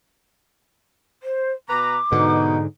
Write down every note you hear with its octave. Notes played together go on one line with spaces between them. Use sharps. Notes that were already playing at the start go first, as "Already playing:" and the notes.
C5
B2 B4 A#5 D6
G#2 B2 D3 D#4